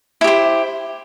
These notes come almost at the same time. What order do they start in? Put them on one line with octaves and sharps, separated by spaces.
E4 G4 C5